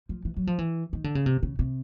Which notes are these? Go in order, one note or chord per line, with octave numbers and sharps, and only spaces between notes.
F3
E3
F#3
F3
E3
D#3
D3
C#3
C3
C#3
C3